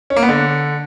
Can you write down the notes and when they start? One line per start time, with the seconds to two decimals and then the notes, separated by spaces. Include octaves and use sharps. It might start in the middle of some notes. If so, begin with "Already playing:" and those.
0.10 C#4
0.16 A#3
0.23 B3
0.29 D3